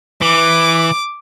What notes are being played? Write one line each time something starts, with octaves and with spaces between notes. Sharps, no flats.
E3 D6